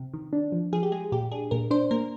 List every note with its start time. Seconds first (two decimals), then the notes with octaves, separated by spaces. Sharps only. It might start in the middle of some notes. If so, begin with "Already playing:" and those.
Already playing: C3
0.14 D#3
0.33 D4
0.52 F3
0.73 F3 G#4
0.83 G4
0.92 G#3 G#4
1.12 A#2 G4
1.31 D4 G#4
1.51 A#2 A#4
1.71 D4 C5
1.91 A#3 A#4